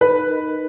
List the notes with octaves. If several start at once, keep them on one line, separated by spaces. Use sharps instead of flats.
D#4 B4
A#4 D#5
D#4